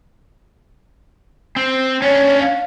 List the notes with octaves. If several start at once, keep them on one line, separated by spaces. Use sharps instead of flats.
C4
C#4 D4 C#5
F5